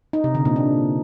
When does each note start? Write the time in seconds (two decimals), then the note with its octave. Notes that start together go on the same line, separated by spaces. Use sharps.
0.13 D#4
0.24 C3
0.35 D3
0.45 A#2
0.56 D4